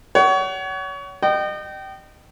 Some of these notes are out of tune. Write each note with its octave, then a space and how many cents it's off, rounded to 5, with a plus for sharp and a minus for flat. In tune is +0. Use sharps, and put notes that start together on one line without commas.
C#5 +30 F#5 +35
D#5 -35 G5 -25